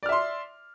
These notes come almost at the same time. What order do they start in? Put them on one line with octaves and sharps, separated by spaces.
D5 F6 E5 C6